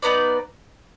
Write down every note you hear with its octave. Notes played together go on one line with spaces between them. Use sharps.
B3 D#4 B4 D5